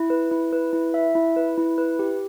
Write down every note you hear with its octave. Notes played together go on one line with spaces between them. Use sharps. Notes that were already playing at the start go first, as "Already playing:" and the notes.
Already playing: E4
B4
E4
B4
E4
E5
E4
B4
E4
B4
G4